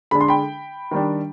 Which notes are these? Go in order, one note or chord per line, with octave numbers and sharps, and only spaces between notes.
D3 G#3 D4 B5
C6
G5 B5
D#3 G3 D4